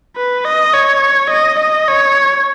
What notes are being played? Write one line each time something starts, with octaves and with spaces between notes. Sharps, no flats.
B4
D#5
C#5
D#5
D#5
C#5